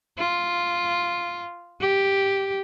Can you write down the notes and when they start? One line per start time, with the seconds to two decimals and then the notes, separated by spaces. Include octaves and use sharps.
0.18 F4
1.81 G4